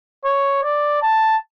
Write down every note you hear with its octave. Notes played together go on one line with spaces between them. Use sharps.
C#5
D5
A5